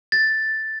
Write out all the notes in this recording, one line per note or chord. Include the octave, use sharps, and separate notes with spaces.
A6